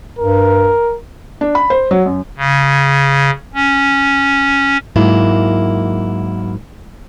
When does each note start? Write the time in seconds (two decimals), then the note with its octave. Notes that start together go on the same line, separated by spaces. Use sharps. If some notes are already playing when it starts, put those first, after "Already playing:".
0.19 G2 A#4
1.41 D4
1.55 B5
1.70 C5
1.91 F#3
2.06 F#2
2.38 C#3
3.54 C#4
4.96 G#2 F#3 A#3 E4